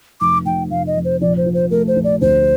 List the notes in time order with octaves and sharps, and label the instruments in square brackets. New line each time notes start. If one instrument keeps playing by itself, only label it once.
[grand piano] F1 [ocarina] D6
[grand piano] F1 [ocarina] G5
[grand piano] F1 [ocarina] F5
[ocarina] D#5
[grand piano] F1
[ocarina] C5
[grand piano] A#1 [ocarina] D5
[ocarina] C5
[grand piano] F3
[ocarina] C5
[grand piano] A3 [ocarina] A#4
[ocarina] C5
[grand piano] A#1
[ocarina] D5
[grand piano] D2 [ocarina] C5